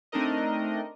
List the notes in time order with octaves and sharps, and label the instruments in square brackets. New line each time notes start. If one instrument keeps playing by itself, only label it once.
[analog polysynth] A3 C4 D4 D#4 A#4 D#5